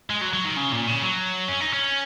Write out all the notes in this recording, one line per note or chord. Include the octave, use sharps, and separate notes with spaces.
G#3
F#3
F#3
D#3
C#3
A#2
C#3
F#3
C#4
D#4
C#4